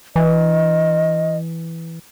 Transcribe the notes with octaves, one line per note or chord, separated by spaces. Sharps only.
E3 D#5